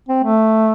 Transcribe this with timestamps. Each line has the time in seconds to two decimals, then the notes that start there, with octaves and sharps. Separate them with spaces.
0.09 C4
0.24 A3